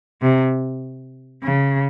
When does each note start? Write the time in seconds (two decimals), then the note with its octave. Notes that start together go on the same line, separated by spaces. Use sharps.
0.22 C3
1.43 C#3